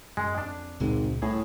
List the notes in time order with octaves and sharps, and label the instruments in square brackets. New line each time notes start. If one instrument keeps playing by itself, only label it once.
[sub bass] F#2 [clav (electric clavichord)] G#3
[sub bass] F2 [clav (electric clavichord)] D4
[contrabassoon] G#1 [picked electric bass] C#2 A#2 G#3
[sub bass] C2 [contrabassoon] A2 [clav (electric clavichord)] G#4